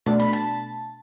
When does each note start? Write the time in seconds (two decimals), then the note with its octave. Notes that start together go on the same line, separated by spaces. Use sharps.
0.06 B2 A3 D4 A5
0.19 B5
0.33 A5